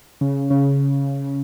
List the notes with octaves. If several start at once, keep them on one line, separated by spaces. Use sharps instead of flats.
C#3
C#3